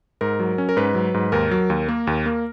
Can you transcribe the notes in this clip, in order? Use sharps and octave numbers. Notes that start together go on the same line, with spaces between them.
G#2 A#4
F#3
C#4
A#4
G#2 B4
F#3
G#2
D#2 A#4
F#3
D#2
A#3
D#2
A#3